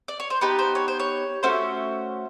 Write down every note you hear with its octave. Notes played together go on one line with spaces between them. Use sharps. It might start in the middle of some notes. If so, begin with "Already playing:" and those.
D5
C#5
C5
B3 D#4 G4 B4
C5
C#5
C5
C#5
A3 C#4 F#4 C5